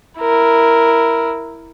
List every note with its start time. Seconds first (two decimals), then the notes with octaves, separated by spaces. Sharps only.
0.19 E4 A#4